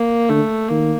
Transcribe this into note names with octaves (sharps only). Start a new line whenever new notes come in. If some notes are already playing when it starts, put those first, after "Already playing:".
Already playing: A#3
D3 A3
D#3 A#3